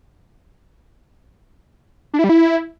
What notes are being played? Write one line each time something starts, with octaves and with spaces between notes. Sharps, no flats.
D4
E4
G3
E4